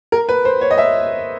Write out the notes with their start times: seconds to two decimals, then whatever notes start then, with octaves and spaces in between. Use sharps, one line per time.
0.12 A#4
0.29 B4
0.45 C5
0.61 C#5
0.71 D#5
0.78 E5